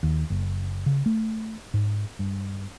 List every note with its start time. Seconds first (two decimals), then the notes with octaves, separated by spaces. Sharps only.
0.03 D#2
0.30 F#1
0.86 C#3
1.06 A3
1.74 G#2
2.19 G2